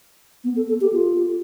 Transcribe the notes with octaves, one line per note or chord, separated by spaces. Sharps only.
B3
A4
A4
G4
F4